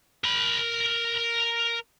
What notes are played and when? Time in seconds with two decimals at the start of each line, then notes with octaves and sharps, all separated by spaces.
0.24 A#4 B5